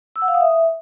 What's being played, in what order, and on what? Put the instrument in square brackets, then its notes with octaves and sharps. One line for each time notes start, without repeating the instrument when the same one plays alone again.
[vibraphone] E6
F#5
F5
D#6
E5